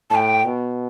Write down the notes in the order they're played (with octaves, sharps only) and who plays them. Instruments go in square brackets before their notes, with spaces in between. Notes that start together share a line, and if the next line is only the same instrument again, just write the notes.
[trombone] A2 [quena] G5 A5
[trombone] B2